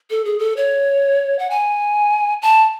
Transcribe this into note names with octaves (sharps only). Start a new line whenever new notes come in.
A4
G#4
A4
C#5
F#5
G#5
A5